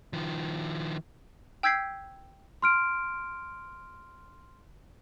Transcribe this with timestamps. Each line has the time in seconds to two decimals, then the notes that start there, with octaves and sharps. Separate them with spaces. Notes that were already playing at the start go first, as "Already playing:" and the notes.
0.13 D#3 F3
1.63 G5 E6 G6 G#6 B6 C7
2.62 C6 F6 D7